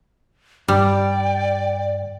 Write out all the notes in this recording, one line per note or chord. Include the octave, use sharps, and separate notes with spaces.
G2 G3 D5 G5